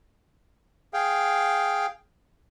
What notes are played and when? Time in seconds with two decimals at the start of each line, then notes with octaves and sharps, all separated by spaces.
0.94 G#4 F5 G5